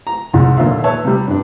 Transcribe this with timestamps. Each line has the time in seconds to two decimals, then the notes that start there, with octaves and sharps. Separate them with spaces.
0.07 A#5
0.33 C2 G#2
0.57 D#2 A#2 D3 F4 E5
0.84 B4 C#5 E5 A5
1.05 C3 G3
1.28 G2 D4